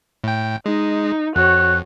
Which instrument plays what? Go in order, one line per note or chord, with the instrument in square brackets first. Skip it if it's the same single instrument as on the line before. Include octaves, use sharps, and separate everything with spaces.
[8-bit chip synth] A2 G5
[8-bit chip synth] G#3 [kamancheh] D#4
[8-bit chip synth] F2 [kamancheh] F#4 C#5 [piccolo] F#6